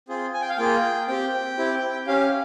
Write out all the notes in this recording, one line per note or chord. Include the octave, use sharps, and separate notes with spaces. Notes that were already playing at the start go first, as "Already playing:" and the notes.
C4 F4 G#4
G#5
G5
F5
A#3 F4 G#4 G5
C4 G4 G5
C4 E4 G4
C#4 G4 F5